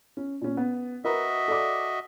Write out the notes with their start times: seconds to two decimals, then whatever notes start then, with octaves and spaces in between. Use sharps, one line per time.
0.17 C#4
0.41 A#2 C#4
0.57 B3
1.04 F#4 A#4 B4 D#5 E5 A#5
1.48 A4 D5 D6